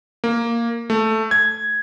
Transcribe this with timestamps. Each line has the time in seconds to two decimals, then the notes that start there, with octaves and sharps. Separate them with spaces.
0.24 A#3
0.90 A3
1.31 G#6